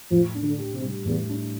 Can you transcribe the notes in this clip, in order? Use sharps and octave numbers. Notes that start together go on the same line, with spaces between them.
A2 F3
D4
D3
G4
C3
G3
E2 A2
D4